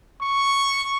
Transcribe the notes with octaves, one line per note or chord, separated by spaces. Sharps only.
C#6